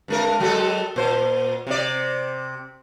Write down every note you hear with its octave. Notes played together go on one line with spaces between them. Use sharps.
G2 G#3 A#4
F#3 G#3 A4
A#2 C5
C3 D5